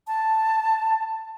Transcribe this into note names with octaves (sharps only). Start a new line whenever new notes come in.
A5